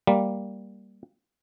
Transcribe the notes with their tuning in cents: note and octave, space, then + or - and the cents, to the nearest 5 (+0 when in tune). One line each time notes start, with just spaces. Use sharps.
G3 +5 A#3 +0